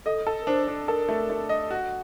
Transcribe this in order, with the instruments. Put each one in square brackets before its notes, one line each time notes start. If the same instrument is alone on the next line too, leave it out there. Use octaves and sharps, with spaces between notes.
[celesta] A4 [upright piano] D#5
[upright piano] A4
[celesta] A#4
[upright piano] D4 [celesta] C5
[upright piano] D4
[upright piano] A4 [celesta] A#4
[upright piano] A3
A3
D#5
F#4